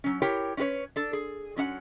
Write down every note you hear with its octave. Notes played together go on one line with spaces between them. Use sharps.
F#3 C#4
E4 G4 A#4 C#5 G5
C#4 D#4 F#4 B4 C#5
D4 A4
G#4
F#3 C#4 D4 F#5